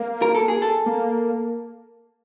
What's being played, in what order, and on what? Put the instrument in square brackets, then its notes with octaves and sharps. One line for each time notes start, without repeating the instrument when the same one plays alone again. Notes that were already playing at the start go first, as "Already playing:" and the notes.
Already playing: [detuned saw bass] A#3
[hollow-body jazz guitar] A#4
A4
G#4
A4
[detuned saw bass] A#3